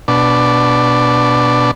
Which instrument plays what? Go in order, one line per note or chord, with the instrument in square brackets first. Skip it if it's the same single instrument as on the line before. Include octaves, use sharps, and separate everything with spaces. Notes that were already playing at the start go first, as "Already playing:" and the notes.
[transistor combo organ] B2 D4